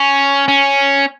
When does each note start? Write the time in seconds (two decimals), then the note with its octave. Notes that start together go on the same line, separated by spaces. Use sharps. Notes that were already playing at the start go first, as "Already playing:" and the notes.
Already playing: C#4
0.48 C#4